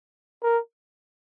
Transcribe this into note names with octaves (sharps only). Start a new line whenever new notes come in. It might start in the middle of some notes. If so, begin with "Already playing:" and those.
A#4